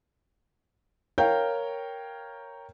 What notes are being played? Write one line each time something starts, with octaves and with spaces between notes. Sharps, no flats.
A#4 C#5 F5 G5 G6